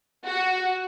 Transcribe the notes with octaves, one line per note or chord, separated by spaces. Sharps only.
F#4